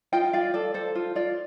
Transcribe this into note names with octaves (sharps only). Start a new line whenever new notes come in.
F4 D#5 G5
F4 D5 F5
A4 D5
A4 C5
F4
F4 D5